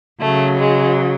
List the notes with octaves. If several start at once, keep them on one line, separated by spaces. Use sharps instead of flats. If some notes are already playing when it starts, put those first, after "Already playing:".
C#3 F#3 A3
G#3